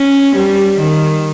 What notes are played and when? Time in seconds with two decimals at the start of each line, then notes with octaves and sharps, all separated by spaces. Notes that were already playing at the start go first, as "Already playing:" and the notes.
Already playing: C#4
0.36 G3
0.79 D#3